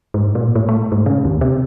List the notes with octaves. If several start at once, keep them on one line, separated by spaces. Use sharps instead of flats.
G#2
A#2
A2
A3
G#2
C#3
D#2
C3